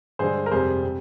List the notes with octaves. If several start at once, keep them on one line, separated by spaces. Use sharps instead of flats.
G2 D3 G#3 G#4 C5
A#4
F2 C3 G3 G#4 C5
C3